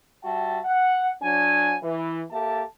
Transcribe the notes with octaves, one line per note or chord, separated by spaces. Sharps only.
G3 F#4 E5 G5 A5
F#5
F#3 D4 G#5
E3
A#3 G4 A4 E5 A5